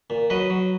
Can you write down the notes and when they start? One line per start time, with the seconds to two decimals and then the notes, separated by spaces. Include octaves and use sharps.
0.10 A#2
0.30 F#3 B4 D#5
0.50 F#3